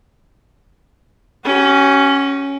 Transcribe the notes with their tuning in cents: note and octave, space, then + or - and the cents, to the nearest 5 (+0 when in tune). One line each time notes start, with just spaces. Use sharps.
C#4 +0 F#4 +45